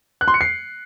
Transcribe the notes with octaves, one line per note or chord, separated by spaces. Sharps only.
F#6
C6
C#7
C7